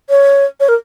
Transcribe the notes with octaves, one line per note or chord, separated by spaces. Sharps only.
C#5
C#5
A#4